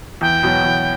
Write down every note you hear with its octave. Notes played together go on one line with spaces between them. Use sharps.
E2 G5
B2 F#3 B3 F#4
E2